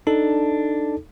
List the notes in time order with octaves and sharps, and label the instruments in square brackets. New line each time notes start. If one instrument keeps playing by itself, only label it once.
[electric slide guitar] D4 [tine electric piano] D#4 A4